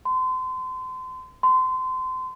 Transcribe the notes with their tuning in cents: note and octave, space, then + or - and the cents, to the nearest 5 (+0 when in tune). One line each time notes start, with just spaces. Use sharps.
C6 -30
C6 -25